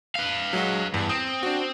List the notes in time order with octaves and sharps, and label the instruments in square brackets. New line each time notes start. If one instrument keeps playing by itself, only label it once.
[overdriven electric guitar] B4 F5
[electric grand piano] F#3 G#3 F#4
[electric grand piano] E2 [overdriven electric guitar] G2
[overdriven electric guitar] C4 [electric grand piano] D#6
[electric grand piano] D4 F#4